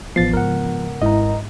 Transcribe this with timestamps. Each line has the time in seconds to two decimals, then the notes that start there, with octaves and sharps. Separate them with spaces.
0.16 A1 F3 B3 A6 C7
0.33 G#2 C#3 A#4 F#5
1.02 G#1 G#2 C#4 E4 D#5 A#5